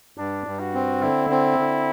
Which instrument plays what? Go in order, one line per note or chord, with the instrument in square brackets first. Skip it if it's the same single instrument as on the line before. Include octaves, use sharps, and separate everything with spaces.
[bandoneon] G2 [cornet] D4
[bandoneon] G2
[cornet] F#4
[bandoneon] C4
[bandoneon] D3 [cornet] E4
[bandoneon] C4
D3